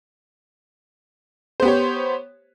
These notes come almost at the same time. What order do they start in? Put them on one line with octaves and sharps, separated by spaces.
C5 B3 G4 C#5